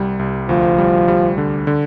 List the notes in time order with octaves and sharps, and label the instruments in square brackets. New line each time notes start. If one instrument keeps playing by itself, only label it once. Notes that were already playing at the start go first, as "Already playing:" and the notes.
Already playing: [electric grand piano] C2 G3
C2
[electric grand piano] D2 [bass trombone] F3
[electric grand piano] G3
G3
D3
D3